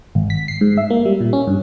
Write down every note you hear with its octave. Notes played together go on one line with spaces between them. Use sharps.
G#1
B6
C7
G#2
E5
A#3
G3
A#2
C#4
G2